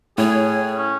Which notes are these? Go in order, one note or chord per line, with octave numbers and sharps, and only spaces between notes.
A2 G#4 C#5
C#4